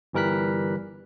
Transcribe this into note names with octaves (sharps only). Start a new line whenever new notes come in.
G1 E3 G3 A#4 F#6 B6